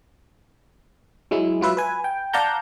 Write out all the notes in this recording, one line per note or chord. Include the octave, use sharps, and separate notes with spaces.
F#3 G#3 E4
F#3 F4 B4 E5
B4 G#5
G5
D5 F5 F#5 A5 A#5 G6